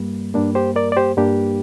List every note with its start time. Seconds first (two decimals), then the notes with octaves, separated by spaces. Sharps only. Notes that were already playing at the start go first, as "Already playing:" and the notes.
Already playing: G2 G3 A#3
0.34 G2 G3 A#3 D4
0.55 G4 C5
0.76 A#4 D5
0.92 D5
0.97 G4 C5
1.17 G2 G3 A#3 D4 G4